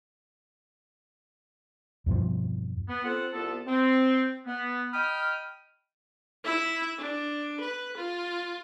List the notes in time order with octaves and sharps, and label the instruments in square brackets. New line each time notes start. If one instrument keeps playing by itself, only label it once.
[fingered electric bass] E2 G2 B2 F3
[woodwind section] B3
C4 F4 A4 F#5
C2 B3 F4 A4 A5
C4
B3
D#5 G5 B5 D#6 F6
[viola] E4 E5
D4
B4
F4